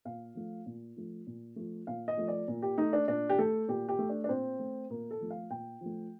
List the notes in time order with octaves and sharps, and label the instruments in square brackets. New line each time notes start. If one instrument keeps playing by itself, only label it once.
[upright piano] A#2 F5
F3 A3
A#2
F3 A3
A#2
F3 A3
A#2 F5
D#5
F3 A3
D5
A#2
G4
A3 D#4
D4
A#2 D4
G4
A3 A4
A#2 G4
G4
A3
D4
D4
A#2 C4
A3
A#2 A#3
A4
F3 A3
F5
A#2 G5
F3 A3